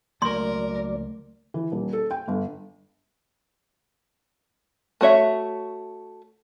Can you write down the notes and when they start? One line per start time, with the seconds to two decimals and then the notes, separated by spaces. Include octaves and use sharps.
0.22 C#2 F#3 A3 A#3 A#4 D5 C6
1.54 E3
1.72 D#1
1.93 A4
2.11 G5
2.28 G1
5.01 A3 F#4 C#5 E5